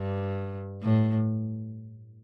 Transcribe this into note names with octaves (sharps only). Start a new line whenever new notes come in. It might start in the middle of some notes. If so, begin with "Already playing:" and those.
Already playing: G2
A2